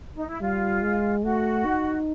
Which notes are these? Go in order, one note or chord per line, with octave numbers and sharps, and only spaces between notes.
D#4
E4
G3 F4
G#3
A3 F#4
D#4